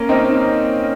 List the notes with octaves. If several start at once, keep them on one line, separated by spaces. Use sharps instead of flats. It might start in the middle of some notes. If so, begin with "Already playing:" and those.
Already playing: A#3 C#4
C4 D#4